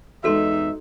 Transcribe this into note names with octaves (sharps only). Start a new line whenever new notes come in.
E2 G#3 D#4 F#4 A4 E5 C6